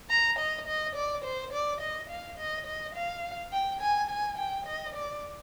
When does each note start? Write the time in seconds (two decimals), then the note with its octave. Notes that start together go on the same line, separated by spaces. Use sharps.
0.10 A#5
0.39 D#5
0.67 D#5
0.95 D5
1.24 C5
1.53 D5
1.81 D#5
2.10 F5
2.38 D#5
2.67 D#5
2.95 F5
3.52 G5
3.81 G#5
4.10 G#5
4.38 G5
4.67 D#5
4.95 D5